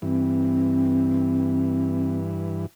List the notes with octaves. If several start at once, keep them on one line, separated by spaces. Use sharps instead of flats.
G2 E3 C4